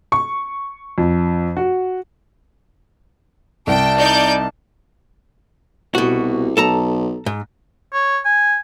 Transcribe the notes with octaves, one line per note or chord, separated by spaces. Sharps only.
C#6
F2
F#4
C2 G5 A5
D#4 D5 G6
C2 B2 F#4
B1 A4 A5 A#5
G#2
C#5
G#5